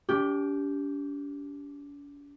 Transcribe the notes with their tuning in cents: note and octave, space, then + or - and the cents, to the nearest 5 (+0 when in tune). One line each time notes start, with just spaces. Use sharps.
D4 -45 G4 +0